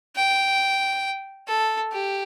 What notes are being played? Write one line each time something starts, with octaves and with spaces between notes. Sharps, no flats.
G5
A4
G4